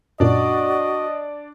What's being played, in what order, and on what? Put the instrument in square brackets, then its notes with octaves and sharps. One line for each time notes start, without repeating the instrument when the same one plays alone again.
[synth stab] F#2 A#2 [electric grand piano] D4 D5 [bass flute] F#4 [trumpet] D#5